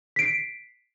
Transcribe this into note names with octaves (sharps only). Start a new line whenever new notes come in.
B6 C7 D7